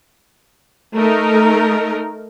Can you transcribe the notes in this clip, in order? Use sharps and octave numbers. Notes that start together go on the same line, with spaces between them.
A3 D#4 A#4